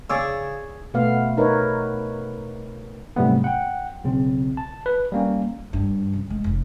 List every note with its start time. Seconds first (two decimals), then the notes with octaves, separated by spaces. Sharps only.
0.10 C#3 G#4 C#5 D5 E6
0.94 B2 A3 B3 F5
1.37 D#4 A#4 B4 C#5
3.16 G#2 C3 F#3 G3 A3 B3
3.44 F#5 G5
4.04 B1 C#3 C4
4.57 A5
4.86 B4
5.12 G3 A#3 C#4
5.73 G2
6.13 C#3
6.30 G#3
6.44 F1